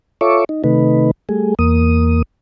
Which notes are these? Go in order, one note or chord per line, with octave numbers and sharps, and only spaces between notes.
F4 A4 C#5 E5 C#6 D6
D#4
C3 D#3 A3 D#4 B4
G3 A3 G#4
E2 A#3 D#6